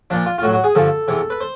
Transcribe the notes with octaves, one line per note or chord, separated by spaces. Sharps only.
A#2 F3 D4
F4
F4
A2 F#4
F#3
F#4
G#4
G2 D3 F3 A4
E2 C3 E3
B4
C5